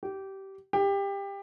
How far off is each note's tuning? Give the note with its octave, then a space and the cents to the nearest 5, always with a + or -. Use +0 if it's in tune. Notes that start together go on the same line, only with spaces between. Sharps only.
G4 -20
G4 +20